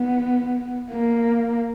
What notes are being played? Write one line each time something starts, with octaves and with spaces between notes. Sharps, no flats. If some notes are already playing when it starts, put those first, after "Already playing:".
Already playing: B3
A#3